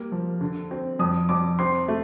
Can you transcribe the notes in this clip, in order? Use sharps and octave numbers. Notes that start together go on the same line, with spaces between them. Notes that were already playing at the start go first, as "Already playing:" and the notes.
Already playing: G3 A#3
F3
D3
C4
F2 D#6
F2 D6
C4 C6
A3